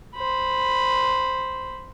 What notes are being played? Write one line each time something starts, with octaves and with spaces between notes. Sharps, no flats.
C5 B5